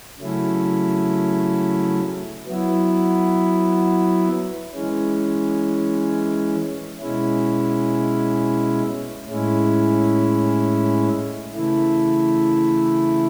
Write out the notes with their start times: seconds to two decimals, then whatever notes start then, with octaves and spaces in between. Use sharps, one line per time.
0.20 C#3 F#3 A3 C#4 E4
2.47 F#3 B3 E4
4.74 E3 G#3 C#4
7.00 B2 G#3 C#4 E4
9.27 A2 G#3 C#4 E4
11.54 C#3 E3 A3 E4